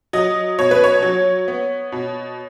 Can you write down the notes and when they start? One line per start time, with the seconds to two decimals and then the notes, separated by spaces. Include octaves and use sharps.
0.13 F#3 D#5
0.58 B2 C#5
0.71 B4
0.84 C#5
1.03 F#3
1.48 B3
1.92 B2